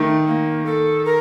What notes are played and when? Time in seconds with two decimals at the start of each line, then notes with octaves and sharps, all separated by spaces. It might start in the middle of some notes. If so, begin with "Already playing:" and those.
Already playing: D#3 A3
0.27 A#3
0.66 A4
1.05 A#4